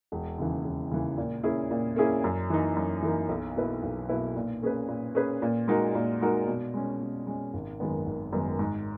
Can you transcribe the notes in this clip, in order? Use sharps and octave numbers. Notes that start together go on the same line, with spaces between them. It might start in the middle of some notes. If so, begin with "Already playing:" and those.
E1
D#2 C#3 E3
E1
D#2 C#3 E3
A#2
A#3 C#4 E4 G#4
A#2
A#3 C#4 E4 G#4
F#2
E3 A#3 D#4
F#2
E3 A#3 D#4
B1
B2 A#3 E4 B4
B1
B2 A#3 E4 B4
A#2
A#3 C#4 G#4 B4
A#2
A#3 C#4 G#4 B4
A#2
G#3 D#4 F#4 A#4
A#2
G#3 D#4 F#4 A#4
B2
G#3 C#4
B2
G#3 C#4
G#1
F#2 D#3 G#3 B3
G#1
F#2 D#3 G#3 B3
G#2